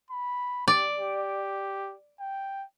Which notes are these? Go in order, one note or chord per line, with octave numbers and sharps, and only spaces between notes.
B5
G4 D5
G4
G5